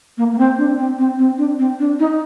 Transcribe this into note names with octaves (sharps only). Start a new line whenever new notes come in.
A#3
A#3
C4
D4
C4
C4
C4
D4
C4
D4
D#4